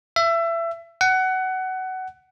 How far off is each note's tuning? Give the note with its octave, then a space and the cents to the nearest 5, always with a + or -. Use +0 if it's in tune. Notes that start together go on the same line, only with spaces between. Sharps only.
E5 +25
F#5 +20